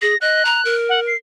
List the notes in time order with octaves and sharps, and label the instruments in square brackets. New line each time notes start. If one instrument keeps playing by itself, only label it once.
[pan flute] G#4 [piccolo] A#6
[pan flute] D#5 [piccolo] F#6
[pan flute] A#5
A#4
[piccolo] F#5
C7